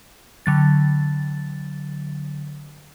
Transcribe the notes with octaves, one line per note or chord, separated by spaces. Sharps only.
D3 F#3 A6